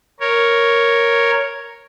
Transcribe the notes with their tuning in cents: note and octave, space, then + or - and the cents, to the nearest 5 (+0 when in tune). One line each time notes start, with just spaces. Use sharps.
A#4 +0 C#5 +0